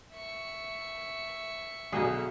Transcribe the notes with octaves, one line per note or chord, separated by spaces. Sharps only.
E5 C#6
B1 B2 D3 G#4 D#5